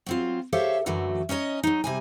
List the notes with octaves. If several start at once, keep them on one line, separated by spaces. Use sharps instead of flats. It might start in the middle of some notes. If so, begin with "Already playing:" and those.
F#3 C4 F4
G4 A4 C5 C#5 E5 F5
F#2 D3 E3 F#3 A3
C#4 D#4 C#5 D#5
F#3 D#4
C3 G3 G#5